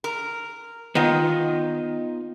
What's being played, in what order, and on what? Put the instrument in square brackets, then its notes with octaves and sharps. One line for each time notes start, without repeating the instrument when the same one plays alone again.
[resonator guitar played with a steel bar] A#4
[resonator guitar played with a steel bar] D#3 [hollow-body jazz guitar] B3 D#4 F4